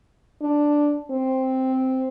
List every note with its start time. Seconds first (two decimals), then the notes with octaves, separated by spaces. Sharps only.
0.41 D4
1.11 C4